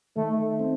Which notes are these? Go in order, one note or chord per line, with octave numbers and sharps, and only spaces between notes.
D#3 A3
C4